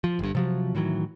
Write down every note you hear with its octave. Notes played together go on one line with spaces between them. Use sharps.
F3
G1 G2
C3 F3 F#3
A2 D#3 E3 F#3